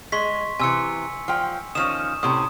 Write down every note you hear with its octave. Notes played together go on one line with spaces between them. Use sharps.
G#3 C6 C#6 B6
C3 E3 G#5 E6 C#7
F3 G5
D#3 F3 C#4 D#6 E7
A2 C3 C#4 D#6